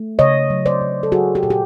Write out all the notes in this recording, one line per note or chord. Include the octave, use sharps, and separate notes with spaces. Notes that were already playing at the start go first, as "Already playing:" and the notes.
Already playing: A3
C#3 C#5 D#5
F#3
C5 D5
C#3
A4
F#3 F#4 G#4
G4
A#2 G#4
G4